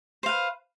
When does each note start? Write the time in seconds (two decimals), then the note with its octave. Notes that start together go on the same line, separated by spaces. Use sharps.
0.23 C5
0.26 F5
0.29 B4